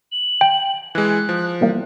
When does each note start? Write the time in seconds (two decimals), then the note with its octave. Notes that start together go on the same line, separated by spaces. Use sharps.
0.12 F#7
0.41 G5
0.95 E3 G#3 F#6
1.29 F3
1.61 E3 G3 A#3